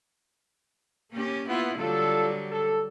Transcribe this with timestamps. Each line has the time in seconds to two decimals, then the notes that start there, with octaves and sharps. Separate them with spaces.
1.12 A#3 C#4 G4
1.49 B3 E4 F4
1.79 D3 F#3 G3 F4 A4
2.51 A4